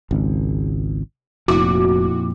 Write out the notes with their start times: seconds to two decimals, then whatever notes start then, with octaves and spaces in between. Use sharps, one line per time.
0.11 G#1 C#2
1.48 F1 F2 A#2 E4 F#4 D6